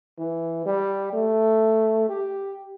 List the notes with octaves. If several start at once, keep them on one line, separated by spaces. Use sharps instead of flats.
E3
G3
A3
G4